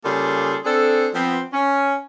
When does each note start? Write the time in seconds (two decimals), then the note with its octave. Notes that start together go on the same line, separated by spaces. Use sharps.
0.05 C#3 G3 A#3 F4 G#4 A4
0.65 C4 D4 G#4 A4
1.15 F3 B3 C4
1.53 C#4